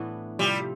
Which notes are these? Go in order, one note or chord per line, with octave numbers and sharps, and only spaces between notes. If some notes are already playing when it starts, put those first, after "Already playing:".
Already playing: A2 E3 B3 D4
C3 F3 G3 C4